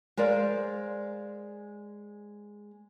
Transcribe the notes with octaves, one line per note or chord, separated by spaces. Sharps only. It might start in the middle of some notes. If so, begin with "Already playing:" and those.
G#3 A#4 C5 D5 F5